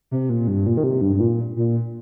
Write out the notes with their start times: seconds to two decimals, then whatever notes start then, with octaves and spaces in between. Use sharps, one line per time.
0.11 C3
0.29 A#2
0.48 G2
0.66 A#2
0.77 D#3
0.84 C3
1.01 G2
1.15 G2
1.20 A#2
1.57 A#2